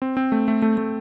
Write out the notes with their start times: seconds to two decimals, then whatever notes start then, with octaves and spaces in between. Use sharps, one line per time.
0.02 C4
0.17 C4
0.32 A3
0.48 A3
0.62 A3
0.78 A3